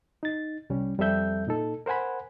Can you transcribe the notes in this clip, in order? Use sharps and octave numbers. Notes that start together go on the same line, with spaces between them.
D#4 A6
C2 G3 C#4
F2 G3 C4 A4 E5 G6
A#2 D#4 A4
A#4 C5 F#5 G#5 B5